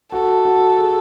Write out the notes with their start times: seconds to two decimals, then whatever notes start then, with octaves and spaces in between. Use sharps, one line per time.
0.12 F#4 A4
0.45 F#4
0.79 G#4